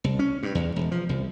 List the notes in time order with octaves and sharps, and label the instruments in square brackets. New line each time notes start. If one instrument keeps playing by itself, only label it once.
[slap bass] C2
C#4
G2
E2
E1
F3
C2